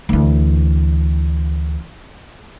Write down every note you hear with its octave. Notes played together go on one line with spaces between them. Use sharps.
D2 E3